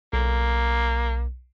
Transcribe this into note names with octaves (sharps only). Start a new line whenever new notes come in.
B1 A#3